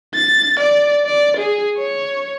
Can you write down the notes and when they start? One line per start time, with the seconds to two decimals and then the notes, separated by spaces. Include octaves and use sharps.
0.15 A6
0.60 D5
1.06 D5
1.37 G#4
1.78 C#5